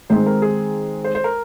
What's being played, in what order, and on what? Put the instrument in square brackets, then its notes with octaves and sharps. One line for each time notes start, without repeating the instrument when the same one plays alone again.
[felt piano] D#3 G#3 C4 D#4 [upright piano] C5
[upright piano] A#4
G#4
C5
C5
A#4